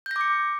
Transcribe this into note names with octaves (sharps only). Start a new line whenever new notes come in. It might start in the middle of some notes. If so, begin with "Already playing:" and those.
D6 G6 A#6 C#7